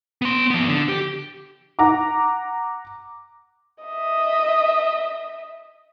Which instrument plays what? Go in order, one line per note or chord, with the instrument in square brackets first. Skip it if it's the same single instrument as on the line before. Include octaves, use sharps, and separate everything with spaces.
[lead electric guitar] B3 C6
F3 B3
D3
G4
[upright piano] F#5 A#5 D6
[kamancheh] D#5 E5